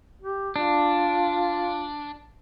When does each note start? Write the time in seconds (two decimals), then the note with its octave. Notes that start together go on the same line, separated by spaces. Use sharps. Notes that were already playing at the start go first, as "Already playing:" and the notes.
0.21 G4
0.56 D4 F4